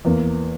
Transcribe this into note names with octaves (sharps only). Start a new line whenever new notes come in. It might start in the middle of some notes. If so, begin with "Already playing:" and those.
E2 E3 A#3